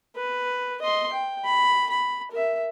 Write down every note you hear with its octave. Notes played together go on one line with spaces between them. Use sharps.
B4
D#5 C6
G5
B5
B5
A#4 E5